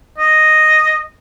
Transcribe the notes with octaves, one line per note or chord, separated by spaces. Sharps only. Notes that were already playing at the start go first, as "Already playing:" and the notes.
D#5